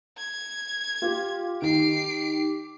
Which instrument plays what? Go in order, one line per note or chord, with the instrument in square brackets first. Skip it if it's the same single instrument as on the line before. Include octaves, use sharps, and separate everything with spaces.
[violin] G#6
[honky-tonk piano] F4 [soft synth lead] G4
[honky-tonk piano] D#3 [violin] C7 D7